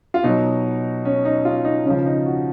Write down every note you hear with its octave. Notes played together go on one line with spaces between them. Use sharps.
F4
B2 F#3 D#4
C#4
D#4
F4
D#4
C#3 F3 C#4
D#4
F#4